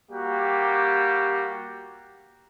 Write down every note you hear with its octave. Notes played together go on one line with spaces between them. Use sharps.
G3 A#3 F#4 G4